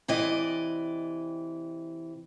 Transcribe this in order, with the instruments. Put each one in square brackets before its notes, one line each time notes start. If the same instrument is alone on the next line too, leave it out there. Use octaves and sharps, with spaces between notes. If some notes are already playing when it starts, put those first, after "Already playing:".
[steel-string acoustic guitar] C3 E3 D5 D#5